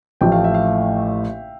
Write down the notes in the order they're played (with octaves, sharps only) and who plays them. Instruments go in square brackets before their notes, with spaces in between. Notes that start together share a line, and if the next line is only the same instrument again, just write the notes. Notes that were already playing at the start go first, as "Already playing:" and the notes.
[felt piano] A1 A2 F3 A3 [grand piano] G5
[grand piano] F5
E5
F5